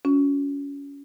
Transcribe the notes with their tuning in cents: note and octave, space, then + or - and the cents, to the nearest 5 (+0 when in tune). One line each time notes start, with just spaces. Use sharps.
C#4 +25 F#4 -30